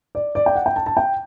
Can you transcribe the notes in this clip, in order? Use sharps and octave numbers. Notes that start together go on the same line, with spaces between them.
D5
D5
G5
F#5
G5
A5
A5
G5